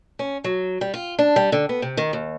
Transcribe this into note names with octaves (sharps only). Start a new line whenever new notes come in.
C#4
F#3
G3
F4
D4
G3
D3
B3
C3
D#3
D#2